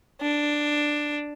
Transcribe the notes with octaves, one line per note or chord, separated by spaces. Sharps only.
D4